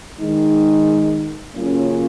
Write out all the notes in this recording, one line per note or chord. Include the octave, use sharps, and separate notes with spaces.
D#3 G#3 D#4
C#3 F#3 A#3 C#4 F4